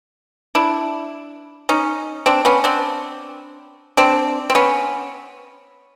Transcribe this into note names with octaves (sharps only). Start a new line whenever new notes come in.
D4 E4
C#4 D#4
C4 D4
B3 C#4
C4 D4
C4 D4
C4
B3 C#4